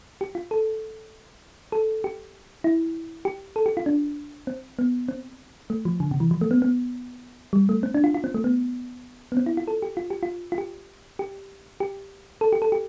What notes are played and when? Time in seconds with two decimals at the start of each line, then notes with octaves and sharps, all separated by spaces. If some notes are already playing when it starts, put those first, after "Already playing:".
0.21 G4
0.35 F4
0.51 A4
1.72 A4
2.04 G4
2.64 E4
3.25 G4
3.56 A4
3.66 G4
3.77 F4
3.86 D4
4.47 C4
4.79 B3
5.09 C4
5.70 A3
5.85 F3
6.00 D3
6.11 C3
6.20 E3
6.31 F3
6.41 A3
6.51 B3
6.62 B3
7.53 G3
7.69 A3
7.83 C4
7.94 D4
8.04 F4
8.14 F4
8.24 C4
8.34 A3
8.44 B3
9.32 B3
9.37 C4
9.46 E4
9.57 F4
9.68 A4
9.82 G4
9.97 F4
10.10 G4
10.23 F4
10.52 F4
10.58 G4
11.19 G4
11.80 G4
12.41 A4
12.53 G4
12.62 A4
12.72 G4